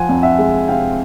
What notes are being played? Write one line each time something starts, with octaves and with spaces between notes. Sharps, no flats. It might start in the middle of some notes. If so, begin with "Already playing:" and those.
Already playing: F3 F#5 G#5
F2
E5 F#5
G#3
C3 F5 G5